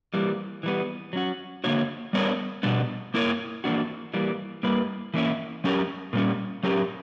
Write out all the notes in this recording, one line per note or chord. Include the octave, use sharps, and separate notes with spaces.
E3 G3 A#3
E3 G3 B3
F#3 C#4 F#4
D3 A#3 D4 F#4 C#5
G3 B3 D4 A#4 C#5
B2 G3 B3 D4
A#3 E4 A#4 C#5
E3 A#3 D4 F#4
E3 G3 A#3
G3 A#3 E4 B4
E3 A#3 C#4 E4
F#3 C#4 G4 A#4
A#2 G3 C#4
F#3 C#4 G4 A#4